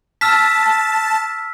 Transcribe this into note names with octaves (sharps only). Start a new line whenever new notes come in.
A5 E6 F6 B6